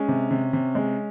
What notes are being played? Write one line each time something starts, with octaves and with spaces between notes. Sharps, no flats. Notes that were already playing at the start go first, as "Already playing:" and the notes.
Already playing: G#3 C#4
C3
C3
C3
G#3